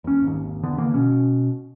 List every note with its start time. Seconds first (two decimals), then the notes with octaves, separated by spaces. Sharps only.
0.04 D#2 C#4
0.23 G#1 D#2
0.63 A1 E2 D3 B3
0.78 D3 E3 A#3
0.94 B2 C#4